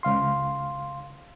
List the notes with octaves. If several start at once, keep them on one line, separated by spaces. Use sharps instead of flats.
C#2 F5 C6